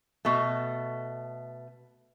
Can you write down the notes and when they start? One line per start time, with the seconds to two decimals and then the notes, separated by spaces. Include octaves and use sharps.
0.25 B2 A3